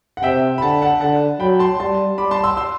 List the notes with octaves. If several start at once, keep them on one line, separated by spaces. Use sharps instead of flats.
F#5
C3 E5 G5
B5
D3 F#5 A5
F#5 A5
D3 F#5 A5
F#3 G5 B5
A5 C6
G3 A5 C6
G3 B5 D6
A5 C6
C6 E6
C6 E6